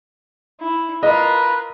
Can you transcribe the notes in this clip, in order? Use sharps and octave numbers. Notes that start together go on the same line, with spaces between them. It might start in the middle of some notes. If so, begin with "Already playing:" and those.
E4
F4 A#4 B4 D#5